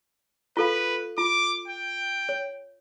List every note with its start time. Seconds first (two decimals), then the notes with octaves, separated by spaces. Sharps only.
0.57 F4 A4 B4 F5
1.18 F4 D6
1.68 G5
2.29 C#5